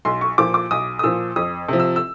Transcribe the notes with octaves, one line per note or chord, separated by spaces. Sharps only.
B1 C6
C#6
A#2 F3 D6
D6
B1 D#6
D#6
A#2 F3 E6
F2 D#6
C3 F3
E6
E6